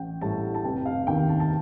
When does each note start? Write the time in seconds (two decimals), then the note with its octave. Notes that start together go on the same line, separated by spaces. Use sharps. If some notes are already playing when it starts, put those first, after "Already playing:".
Already playing: A1 G5
0.21 A2 G3 A5
0.55 A5
0.64 F1 G5
0.85 F5
1.07 D#2 D#3 G5
1.29 A5
1.40 A5